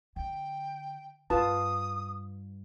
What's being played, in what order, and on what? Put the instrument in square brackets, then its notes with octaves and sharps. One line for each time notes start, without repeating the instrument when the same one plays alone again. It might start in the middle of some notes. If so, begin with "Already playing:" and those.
[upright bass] D3 [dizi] G5
[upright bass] G2 [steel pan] F4 B4 A5 [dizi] D#6